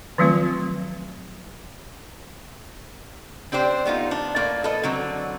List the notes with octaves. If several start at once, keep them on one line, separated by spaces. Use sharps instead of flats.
D#3 F3 F#3 A3 C4 F4
C4 D4 G4 C5 D5
A3 B3 D#4 F4
D4
A2 A#3 D5
A4 B4 D#5
D3 F#3 C4